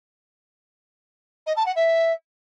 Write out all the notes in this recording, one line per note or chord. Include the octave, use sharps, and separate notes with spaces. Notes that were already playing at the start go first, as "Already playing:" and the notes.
D#5
A5
F#5
E5